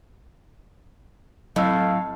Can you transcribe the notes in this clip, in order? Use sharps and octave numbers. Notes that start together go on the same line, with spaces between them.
A2 F#3 C4 D#5 F5 E6